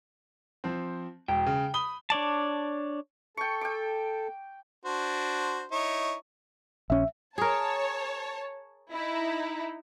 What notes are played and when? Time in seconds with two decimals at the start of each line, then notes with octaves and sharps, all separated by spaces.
0.64 F3 C4
1.28 E1 G5
1.46 C#3
1.74 B5 D#6 G7
2.10 D4 C#5 D5 A5
3.37 A4 G5 C#6
3.61 G5 D6
4.85 D4 F#4 C5
5.71 D#4 E4 C#5
6.90 A#1 C#4 E5
7.38 G#4 A#4 C#5 A5
8.93 D#4 E4